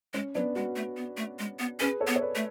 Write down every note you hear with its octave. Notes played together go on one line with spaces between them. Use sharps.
G#3 C#4
F#3 B3 D4
G#3 D4 F#4
A3
B3
A3
G#3
B3
C#4 G#4 B4
A4 C#5
B3
C#5
B4 D5
A3